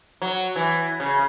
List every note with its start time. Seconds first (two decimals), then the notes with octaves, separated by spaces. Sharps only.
0.22 F#3
0.56 E3
1.00 C#3